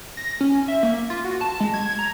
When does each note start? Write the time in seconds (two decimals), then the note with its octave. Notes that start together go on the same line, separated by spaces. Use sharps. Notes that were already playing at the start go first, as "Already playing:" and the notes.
0.17 A#6
0.41 C#4
0.68 E5
0.83 A#3
1.10 F4
1.24 F#4
1.41 A5
1.60 G#3
1.74 G#6
1.99 A#5